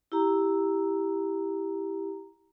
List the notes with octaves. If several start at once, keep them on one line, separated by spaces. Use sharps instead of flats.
E4 G4 A#5